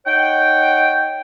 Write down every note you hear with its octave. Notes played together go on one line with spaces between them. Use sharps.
D#4 C#5 F#5 G5